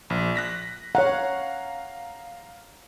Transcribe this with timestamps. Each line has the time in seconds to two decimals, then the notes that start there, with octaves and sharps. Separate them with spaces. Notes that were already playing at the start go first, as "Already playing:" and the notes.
0.10 A#1
0.35 F#6 A#6 B6
0.95 C#5 F5 F#5 A#5